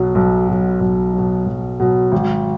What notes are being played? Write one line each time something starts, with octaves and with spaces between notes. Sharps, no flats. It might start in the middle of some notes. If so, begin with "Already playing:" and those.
Already playing: B1 B2 F#3
B1
B2 F#3
B1
B2 F#3
B1
B2 F#3
G#1